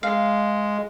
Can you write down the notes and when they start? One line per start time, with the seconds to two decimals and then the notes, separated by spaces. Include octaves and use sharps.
0.03 G#3 F5